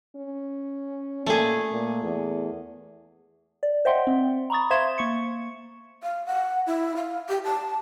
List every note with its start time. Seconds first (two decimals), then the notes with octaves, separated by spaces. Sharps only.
0.16 C#4
1.26 A#2 A3 G#4
1.72 A#2
2.03 E2
3.63 D5
3.85 C5 D#5 E5 F#5 G5 C6
4.07 C4
4.50 A#5 B5 C#6 D#6 A6
4.71 C5 E5 F5 C6 G#6 E7
4.98 A#3 C#6 C#7
6.03 F5
6.26 F#5
6.67 E4
6.96 F5
7.29 G4
7.45 A5